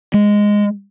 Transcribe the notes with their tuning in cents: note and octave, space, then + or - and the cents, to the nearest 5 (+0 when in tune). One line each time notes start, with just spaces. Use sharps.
G#3 -5